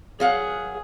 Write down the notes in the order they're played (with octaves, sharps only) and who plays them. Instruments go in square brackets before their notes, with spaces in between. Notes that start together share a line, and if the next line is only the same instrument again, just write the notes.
[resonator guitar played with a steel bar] F#3 F5 F#5 [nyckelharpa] G#4